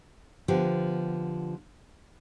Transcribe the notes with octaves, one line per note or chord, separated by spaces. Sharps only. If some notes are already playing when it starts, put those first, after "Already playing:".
D3 F3 B3 G4